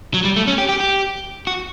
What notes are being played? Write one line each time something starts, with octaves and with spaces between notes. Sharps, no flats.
F#3
G3
A3
C#4
G4
G4
G4
F#4